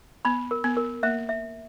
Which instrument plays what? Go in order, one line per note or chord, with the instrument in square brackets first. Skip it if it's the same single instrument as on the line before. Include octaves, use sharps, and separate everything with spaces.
[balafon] B3 [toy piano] B5
[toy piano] A#4
[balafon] B3
[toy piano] A#4
[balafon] A#3 [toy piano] E5
[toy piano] E5